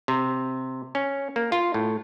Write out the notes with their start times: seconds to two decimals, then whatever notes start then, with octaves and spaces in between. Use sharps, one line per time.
0.08 C3
0.95 C#4
1.36 A#3
1.52 F4
1.74 A2